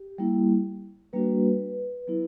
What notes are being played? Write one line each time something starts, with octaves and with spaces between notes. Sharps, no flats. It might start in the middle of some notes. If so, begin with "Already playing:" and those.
Already playing: G4
G3 A#3 E4
G3 A#3 D4 F#4 B4
F#3 B3 E4